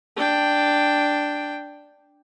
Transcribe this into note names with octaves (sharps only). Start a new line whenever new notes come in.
D4 G5